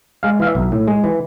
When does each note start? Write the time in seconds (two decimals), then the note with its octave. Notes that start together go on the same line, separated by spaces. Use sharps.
0.23 G#3 F5
0.39 E3 F5
0.47 E5
0.55 B1
0.72 A2
0.88 G#3
1.04 E3